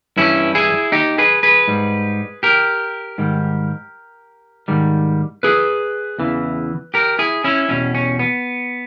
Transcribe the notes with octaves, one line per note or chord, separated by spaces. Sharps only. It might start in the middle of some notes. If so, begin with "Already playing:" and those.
G2 E3 G3 C#4 E4
E4 G#4
D#4 G4
G#4 B4
G#4 B4
G#2 G3
G4 A#4
G#2 D#3 G3
G#2 D#3 G3
G#4 B4
E2 C#3 E3
G4 A#4
E4 G#4
C#4 E4
E2 B2 G3 C#4
C#4
B3